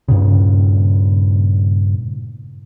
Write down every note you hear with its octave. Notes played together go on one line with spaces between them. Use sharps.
G2 A#2 C#3